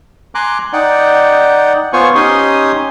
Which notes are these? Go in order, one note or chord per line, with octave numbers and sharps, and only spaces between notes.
G#5 A#5 C6 D6 F#6
D#4 D5 F#5 G5
B3 F4 C5 C#5 G#5 C#6
C#4 D#4 G4 G#5 C6 D#6